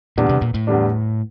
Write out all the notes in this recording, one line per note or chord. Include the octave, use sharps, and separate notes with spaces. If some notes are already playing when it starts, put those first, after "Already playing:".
E2 A#2 D3 G3 D4
C3
A#2
A2
E2 D3 G3 D4